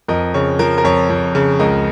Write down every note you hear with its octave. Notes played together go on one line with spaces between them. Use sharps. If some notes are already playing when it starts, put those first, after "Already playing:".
F2 A#4 D#5
C#3 C#5
F3 A#4
A#4
F2 C#5
F2
C#3
C#2 A#4 D#5